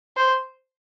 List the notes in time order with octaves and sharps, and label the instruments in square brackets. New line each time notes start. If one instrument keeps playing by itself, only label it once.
[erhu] C5